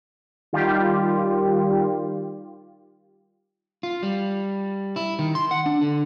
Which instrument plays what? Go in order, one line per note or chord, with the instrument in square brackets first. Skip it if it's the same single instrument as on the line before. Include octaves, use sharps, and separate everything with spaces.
[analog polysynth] D#3 G3 F4 G4
[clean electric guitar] F4
G3
E4
D#3
C6
F#5
D4
D3